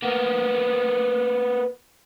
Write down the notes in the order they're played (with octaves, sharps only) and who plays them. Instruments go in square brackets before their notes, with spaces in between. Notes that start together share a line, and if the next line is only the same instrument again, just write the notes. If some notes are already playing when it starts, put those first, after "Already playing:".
[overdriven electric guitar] A#3 B3